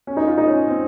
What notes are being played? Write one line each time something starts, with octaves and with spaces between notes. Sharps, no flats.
C#4
D#4
F4
D#4
C#4
C4